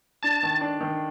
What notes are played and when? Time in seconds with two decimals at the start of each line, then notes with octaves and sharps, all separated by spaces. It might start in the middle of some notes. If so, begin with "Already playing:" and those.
0.23 D4 A5
0.43 D#3
0.61 D4
0.81 D#3